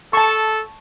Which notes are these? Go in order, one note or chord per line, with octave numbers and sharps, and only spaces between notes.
A4 A5 C#6